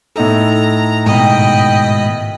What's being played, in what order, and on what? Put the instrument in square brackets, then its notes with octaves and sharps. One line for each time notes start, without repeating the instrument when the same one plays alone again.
[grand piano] A2 D#4 A4 [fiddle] A#5
[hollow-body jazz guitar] G#2 B2 D#3 [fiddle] D#5 B5 [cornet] G5